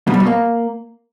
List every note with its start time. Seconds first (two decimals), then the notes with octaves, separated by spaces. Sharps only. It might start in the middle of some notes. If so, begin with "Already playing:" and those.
0.07 B2
0.14 G3
0.20 B2
0.27 A#3